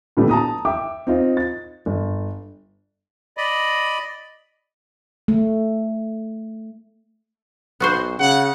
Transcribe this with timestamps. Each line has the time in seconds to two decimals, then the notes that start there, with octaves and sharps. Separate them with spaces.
0.17 A#2 D3 G3 A3 B3
0.29 A5 A#5 D#6
0.65 E5 G5 D6
1.07 C4 D#4 F4
1.37 A6
1.86 G1
3.37 D5 D#5 B5
5.28 A3
7.80 B1 B3 F#4 C5
8.19 C#3 F#5